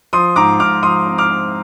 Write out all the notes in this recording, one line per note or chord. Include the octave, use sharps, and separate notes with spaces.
F3 C6 D#6
G#2 A#5 D6
G#2 D6 F6
F3 C6 D#6
C4
D6 F6
C4